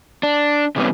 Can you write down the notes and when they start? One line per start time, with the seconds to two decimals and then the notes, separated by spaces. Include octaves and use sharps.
0.23 D4
0.76 C3 E3 G3 A#3 B3 C#4